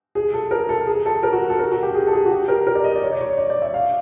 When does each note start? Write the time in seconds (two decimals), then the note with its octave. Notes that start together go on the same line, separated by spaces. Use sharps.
0.15 G#4
0.34 A4
0.51 A#4
0.69 A4
0.87 G#4
1.06 A4
1.23 A#4
1.32 F#4
1.50 A4
1.59 A#4
1.71 F#4
1.83 G4
1.95 G#4
2.07 A4
2.13 G#4
2.26 F#4
2.31 G4
2.48 A#4
2.67 A#4
2.75 D5
2.84 D#5
2.96 D5
3.02 C#5
3.13 D5
3.21 C#5
3.38 D5
3.50 D5
3.62 E5
3.74 F5